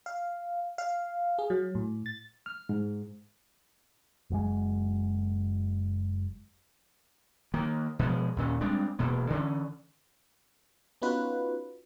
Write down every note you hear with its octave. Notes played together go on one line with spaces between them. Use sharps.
F5
F5
G#4
F#3
A2
A6
F6
G#2
F#1 F#2 A2 G#3
D#3 A#3
B2 F3 G#3
D#2 A#2 C#4
G3 G#3 C4 D4
E1 B2 A#3
D3 E3 B3 C#4
B3 C#4 D#4 F4 F#4 B4